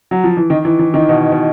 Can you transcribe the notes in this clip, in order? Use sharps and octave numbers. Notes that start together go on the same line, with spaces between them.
F#3
F3
E3
D#3
E3
E3
D#3
B2
B2